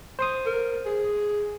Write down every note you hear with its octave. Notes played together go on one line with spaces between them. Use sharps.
C5 C6 D#6
A#4
G#4